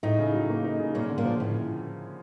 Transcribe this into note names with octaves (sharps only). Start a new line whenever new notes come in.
A2 A3 D#4
C#3
F#3
A#3
D#4
C#3
A#2 A#3 C#4
D3
A#2 A#3
F3
A2